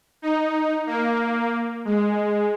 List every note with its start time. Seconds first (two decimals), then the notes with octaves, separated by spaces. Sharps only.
0.22 D#4
0.87 A#3
1.85 G#3